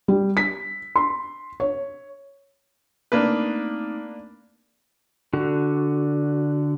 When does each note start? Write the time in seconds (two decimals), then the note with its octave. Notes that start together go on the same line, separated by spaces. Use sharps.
0.08 G3
0.37 B6
0.96 C6
1.60 C#5
3.12 A3 A#3 C4 D4 D#4 B4
5.33 D3 F#4